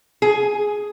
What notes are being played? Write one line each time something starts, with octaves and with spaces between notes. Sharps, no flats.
G#4